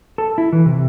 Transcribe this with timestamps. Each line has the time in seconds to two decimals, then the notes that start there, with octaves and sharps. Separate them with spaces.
0.18 A4
0.38 E4
0.53 E3
0.66 C3